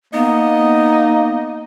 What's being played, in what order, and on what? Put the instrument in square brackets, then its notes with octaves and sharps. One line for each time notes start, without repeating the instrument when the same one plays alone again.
[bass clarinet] A#3 [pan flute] B3 [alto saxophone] D#4 [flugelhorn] D#5